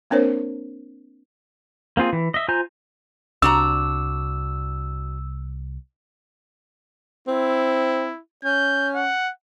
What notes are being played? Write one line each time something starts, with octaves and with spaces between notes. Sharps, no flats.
A#3 C4 D4 A#4 C5 C#5
A#3 C4 F4 G#4
E3
D#5 E5
F4 C5 G#5 A#5 G6
C2 D4 F#4 A#5 E6
C4 E4
C#4 G6
F#5